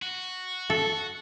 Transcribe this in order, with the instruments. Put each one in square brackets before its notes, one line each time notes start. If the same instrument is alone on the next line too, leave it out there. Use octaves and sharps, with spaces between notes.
[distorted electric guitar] F#4
[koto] A4